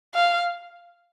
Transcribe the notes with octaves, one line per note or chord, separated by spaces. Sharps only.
F5